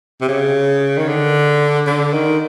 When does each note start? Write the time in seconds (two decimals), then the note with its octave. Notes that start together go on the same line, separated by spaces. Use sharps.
0.21 C3
0.28 C#3
0.97 D#3
1.08 D3
1.87 D3
2.13 D#3